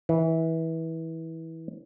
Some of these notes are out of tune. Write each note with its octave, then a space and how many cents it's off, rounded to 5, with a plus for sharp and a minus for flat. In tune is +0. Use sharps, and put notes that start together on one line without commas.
E3 -25